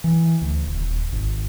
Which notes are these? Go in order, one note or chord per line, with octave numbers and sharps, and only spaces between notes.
E3
D2
D#1
G#1